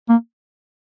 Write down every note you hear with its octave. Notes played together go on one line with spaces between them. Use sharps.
A#3